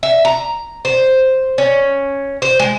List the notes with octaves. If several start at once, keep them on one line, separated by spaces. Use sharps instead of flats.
E5
A#5
C5
C#4
C5
G#3